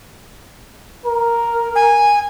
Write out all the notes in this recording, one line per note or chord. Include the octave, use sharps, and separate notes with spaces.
A#4
G#5